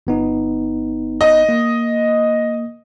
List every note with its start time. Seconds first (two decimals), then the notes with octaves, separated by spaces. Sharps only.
0.07 G1 B3 D#4
1.21 D#5
1.49 A#3